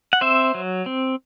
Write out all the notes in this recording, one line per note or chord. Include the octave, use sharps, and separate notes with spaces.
F#5
C4 C5 E5
F#3
C4